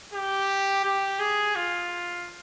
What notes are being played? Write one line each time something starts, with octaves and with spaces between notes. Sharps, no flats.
G4
G4
G#4
F4